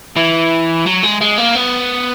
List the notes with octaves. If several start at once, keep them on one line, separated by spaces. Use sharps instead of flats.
E3
F#3
G#3
G#3
A#3
B3